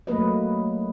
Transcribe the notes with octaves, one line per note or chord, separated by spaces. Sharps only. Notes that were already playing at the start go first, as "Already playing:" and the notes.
F#3 A3 A#3 B4 D#5